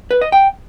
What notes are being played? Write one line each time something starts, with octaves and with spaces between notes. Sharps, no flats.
B4
D#5
G5